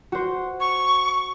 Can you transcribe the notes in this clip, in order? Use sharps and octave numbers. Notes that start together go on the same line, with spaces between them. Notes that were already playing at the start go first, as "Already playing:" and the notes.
F#4 C5
C#6